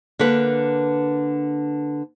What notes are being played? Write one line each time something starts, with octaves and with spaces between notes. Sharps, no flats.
D3 A#3 B4